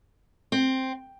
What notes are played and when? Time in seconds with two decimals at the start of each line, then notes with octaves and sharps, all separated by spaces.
0.52 C4